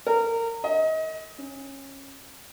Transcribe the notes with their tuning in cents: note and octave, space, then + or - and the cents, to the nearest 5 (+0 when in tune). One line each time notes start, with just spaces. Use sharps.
A#4 -25
D#5 +30
C#4 -20